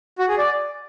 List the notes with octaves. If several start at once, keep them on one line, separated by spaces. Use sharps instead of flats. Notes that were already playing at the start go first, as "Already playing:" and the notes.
F#4
G#4
D5